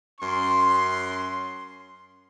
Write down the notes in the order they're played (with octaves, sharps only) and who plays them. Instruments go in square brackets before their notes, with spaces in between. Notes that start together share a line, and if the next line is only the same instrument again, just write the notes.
[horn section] F#2 C#4 C6